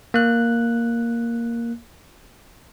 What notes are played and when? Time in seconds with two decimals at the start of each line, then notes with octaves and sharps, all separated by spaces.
0.14 A#3 F#6